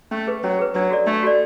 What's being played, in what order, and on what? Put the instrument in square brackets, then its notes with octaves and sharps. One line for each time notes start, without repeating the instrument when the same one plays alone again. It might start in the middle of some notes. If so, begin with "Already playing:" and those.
[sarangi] A3 [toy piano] C#4
[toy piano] G#4 B4
[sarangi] F#3 [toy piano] C#4
[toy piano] G#4 B4
[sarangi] F#3 [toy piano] D4
[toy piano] F#4 A4 D5
[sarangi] A3 [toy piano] D4
[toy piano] F#4 A4 D5